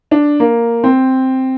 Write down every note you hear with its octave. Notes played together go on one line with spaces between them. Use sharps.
D4
A#3
C4